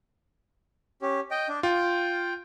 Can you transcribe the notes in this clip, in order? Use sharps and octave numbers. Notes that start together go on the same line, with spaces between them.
C#4 G4
D#5 G5
D4
F4 G5